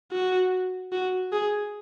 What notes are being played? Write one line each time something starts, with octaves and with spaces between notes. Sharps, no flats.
F#4
F#4
G#4